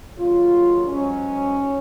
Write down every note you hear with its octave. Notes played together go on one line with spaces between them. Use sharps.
D#2 C#3 F#3 F4
G#2 F#3 C#4